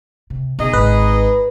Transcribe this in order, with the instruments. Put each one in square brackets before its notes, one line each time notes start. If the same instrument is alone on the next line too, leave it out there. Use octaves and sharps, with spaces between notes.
[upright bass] C3
[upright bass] B2 [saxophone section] D#4 G#4 D#5
[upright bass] G#1 [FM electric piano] B4